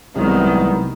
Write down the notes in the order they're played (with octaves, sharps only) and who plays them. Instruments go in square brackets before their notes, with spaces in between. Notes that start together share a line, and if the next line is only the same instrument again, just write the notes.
[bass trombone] C2 [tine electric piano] C3 F#3 G#3 [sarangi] D#3 [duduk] B3